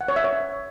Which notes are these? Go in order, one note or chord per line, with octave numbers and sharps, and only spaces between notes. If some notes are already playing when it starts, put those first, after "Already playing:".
F#5
C#5
E5
C#5